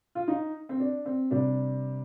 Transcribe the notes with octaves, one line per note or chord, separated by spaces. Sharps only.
F4
D#4
C4
D4
C4
C3 G3 D4